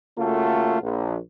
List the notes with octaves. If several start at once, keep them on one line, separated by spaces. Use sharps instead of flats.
C#3 A3 A#3 F4 F#4 A4
A#1